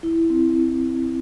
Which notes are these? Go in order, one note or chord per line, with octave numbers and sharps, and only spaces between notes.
E4
C4
C4